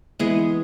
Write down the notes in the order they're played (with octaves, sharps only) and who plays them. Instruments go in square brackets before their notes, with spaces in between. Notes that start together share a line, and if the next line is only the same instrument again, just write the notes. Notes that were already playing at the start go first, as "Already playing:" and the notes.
[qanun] E3 G#3 B3 G#4